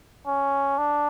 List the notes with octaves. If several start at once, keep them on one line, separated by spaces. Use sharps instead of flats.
C#4
D4